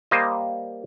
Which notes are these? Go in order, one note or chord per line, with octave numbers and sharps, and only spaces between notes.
G3 A#3 C5 D#5